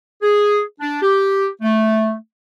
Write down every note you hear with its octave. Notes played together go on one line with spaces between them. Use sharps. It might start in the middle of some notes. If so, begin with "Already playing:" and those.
G#4
D4
G4
A3